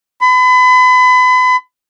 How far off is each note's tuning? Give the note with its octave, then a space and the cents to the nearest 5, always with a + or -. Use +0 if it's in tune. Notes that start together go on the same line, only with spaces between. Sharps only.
B5 +35